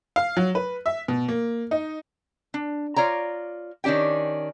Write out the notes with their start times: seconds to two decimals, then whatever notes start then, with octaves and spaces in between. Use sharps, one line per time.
0.16 F5
0.37 F#3
0.55 B4
0.86 E5
1.08 B2
1.28 A#3
1.71 D#4
2.54 D4
2.96 F4 C#5 D5 A#5
3.84 D#3 C#4 D4 G4 G5